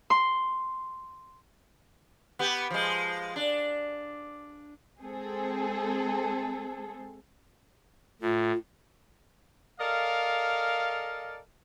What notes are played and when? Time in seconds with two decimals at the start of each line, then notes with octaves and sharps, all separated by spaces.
0.10 C6
2.39 B3 G4
2.70 F3 G#3
3.36 D4
5.01 G#3 C4 G#4 A4
8.22 A2 F4
9.80 A4 A#4 D5 D#5 F5